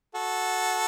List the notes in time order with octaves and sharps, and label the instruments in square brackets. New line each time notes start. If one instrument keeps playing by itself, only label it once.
[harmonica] F#4 A4